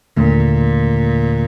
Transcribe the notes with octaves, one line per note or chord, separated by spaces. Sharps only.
D#2 A#2 D3 A3